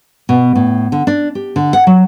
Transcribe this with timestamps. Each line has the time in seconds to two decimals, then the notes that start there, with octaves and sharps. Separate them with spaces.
0.29 B2
0.55 A2
0.92 D3
1.07 D4
1.35 G4
1.56 D3
1.73 F#5
1.87 F#3